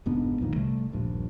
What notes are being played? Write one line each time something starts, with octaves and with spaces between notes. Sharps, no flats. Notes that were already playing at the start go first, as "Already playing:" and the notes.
F1 G#2 B3 D4
B1 F2 A#2 D#3
C3 G3 A3
D#1 A#1 G2